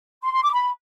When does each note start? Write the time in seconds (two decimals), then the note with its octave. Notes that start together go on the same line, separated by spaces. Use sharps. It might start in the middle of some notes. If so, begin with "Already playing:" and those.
0.23 C6
0.33 C6
0.43 D6
0.53 B5